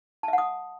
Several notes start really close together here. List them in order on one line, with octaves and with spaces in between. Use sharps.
A5 E5 F#5 D#6